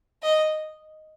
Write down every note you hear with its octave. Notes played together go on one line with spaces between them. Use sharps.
D#5